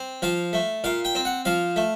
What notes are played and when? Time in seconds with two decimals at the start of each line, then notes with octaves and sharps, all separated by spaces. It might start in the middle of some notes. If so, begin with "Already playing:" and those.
Already playing: C4
0.22 F3 F5
0.53 A3
0.84 A#2 F5
1.05 G5
1.15 C4
1.25 F#5
1.45 F3 F5
1.76 A3